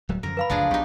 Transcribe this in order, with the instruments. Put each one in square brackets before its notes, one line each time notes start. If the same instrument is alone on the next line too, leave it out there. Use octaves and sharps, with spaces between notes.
[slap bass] D1 F#3 G3
[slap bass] F#2 D3 F3 [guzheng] A#4
[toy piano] B4 F5 B5
[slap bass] F#1 D2 G2 [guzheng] F3 D4 G#4
[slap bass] B1 [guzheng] D#4 G4